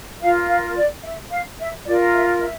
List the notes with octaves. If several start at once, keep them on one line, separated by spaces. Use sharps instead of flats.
F4 A#4 F5
F5
D5
E5
F5
E5
F4 A#4 D5
E5
E5